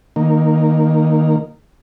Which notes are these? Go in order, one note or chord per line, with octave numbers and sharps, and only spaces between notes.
D#3 A#3